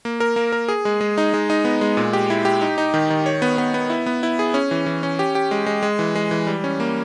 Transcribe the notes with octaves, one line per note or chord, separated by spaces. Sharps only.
A#3
A#4
A#3
A#4
G#4
G#3
G#3
D#4
G#3
D#4
B3
G#3
A#2
G4
E4
G4
D#4
D#4
D#3
D#3
C#5
B3
B3
B3
E4
B3
E4
G#4
C#4
E3
E3
C#4
G4
G4
G#3
G#3
G#3
E3
G#3
E3
G3
C#4
A#3